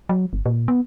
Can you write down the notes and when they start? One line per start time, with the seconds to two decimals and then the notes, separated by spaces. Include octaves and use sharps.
0.09 F#3
0.33 G1
0.46 A#2
0.68 B3